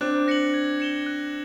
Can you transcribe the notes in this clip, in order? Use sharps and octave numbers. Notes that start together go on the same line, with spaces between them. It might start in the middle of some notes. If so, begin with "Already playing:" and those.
C4 D4 F#6
A#6 C#7 F#7
G#6
C#7 E7 G7
F#6